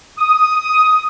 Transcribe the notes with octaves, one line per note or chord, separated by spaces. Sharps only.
D#6